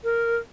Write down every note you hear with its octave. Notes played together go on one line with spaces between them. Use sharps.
A#4